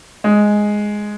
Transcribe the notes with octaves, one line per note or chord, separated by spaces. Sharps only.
G#3